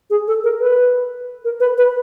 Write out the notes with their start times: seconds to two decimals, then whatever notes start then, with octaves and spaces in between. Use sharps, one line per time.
0.10 G#4
0.28 A4
0.44 A#4
0.60 B4
1.45 A#4
1.60 B4
1.78 B4